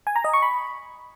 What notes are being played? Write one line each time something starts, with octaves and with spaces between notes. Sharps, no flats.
G#5
A#5
D#5
C#6
B5